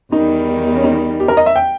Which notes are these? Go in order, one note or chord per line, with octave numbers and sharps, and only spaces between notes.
E2 D#3 G3 D#4
C#4
D#4
G4
A#4
D#5
E5
G5